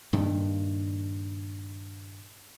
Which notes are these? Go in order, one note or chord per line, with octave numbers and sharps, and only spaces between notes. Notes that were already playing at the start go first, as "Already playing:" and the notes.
G2 A#2 D#3